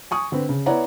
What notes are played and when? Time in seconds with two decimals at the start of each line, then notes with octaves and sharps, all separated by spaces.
0.11 G#5 C#6 D#6
0.32 D3 C4 B4
0.49 C#3
0.66 B3 E4 C#5 D5 F#5 A#5